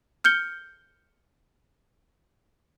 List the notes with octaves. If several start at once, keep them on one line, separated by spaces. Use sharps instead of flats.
F6 G6 C#7 G7